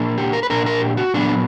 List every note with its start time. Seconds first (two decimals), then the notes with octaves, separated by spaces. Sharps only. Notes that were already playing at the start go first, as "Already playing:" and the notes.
Already playing: A#2 A#3 D4
0.18 G4
0.33 A#4
0.43 B4
0.50 A#2 A#3 D4 A#4
0.66 A#4
0.81 G4
0.97 F#4
1.14 A#2 F#3 B3 D4